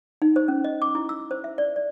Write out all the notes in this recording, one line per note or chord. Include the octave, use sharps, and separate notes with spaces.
D#4
C5
C#4
D#5
D6
E4
E6
C5
E5
D5
D5